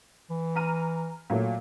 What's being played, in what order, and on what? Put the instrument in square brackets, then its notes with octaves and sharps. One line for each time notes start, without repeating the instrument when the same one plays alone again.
[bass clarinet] E3
[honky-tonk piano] A#5 F6 D#7
A#2 F#3 A3